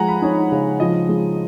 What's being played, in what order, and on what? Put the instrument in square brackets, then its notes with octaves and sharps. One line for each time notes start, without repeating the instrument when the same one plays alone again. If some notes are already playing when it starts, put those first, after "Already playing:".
Already playing: [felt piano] F3 G#3 [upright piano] F#5 G#5 A#5
[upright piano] B5
[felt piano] D#4 [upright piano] C#5
[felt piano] C#3
[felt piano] F3 [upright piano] D#5
[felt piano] G#3